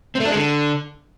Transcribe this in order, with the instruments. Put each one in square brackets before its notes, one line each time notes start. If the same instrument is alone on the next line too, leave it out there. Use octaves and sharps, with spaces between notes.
[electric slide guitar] C4
A3
D4
G#3
D3